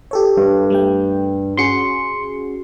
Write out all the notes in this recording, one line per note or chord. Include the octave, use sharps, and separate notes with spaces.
G4 A4 C#5
G2
G3 A3 G5
C#4 F#4 G#4 C6 C#7